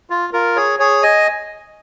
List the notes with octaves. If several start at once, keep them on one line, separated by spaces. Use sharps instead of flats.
F4
F4 A#4
G#4 C#5
G#4 C#5
D#5 G#5